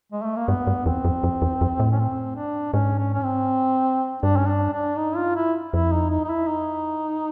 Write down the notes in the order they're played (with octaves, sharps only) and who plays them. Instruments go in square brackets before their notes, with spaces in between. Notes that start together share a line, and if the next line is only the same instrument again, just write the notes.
[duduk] G#3
A3
A#3
[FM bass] G2 [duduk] B3
[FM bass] G2
[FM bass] E2 [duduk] C4
[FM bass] F2
F2
E2
F2
A2
[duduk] C#4
C4
D4
[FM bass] G#2 [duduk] C#4
[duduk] C#4
C#4
C4
[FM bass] G2 [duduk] D4
[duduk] C#4
D4
D4
D#4
F4
E4
[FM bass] F2 [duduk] E4
[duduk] D#4
D#4
D#4
E4
D#4